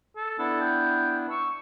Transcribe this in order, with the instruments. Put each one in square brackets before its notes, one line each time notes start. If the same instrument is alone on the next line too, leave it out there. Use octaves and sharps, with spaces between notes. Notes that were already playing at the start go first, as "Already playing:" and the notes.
[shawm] A4
[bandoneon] B3 D4 E4 [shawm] A4
[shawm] G5
[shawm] C#6 [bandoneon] E6